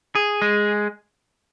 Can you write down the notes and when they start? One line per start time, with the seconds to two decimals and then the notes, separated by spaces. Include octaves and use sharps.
0.15 G#4
0.42 G#3